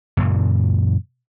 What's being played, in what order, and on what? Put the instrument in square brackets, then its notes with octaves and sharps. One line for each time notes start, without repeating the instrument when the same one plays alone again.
[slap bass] F#2 A#2 C#3 E3